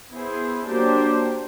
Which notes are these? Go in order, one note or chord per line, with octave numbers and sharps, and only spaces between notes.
B3 E4 G#4 C5
F#3 A#3 D4 G4 C5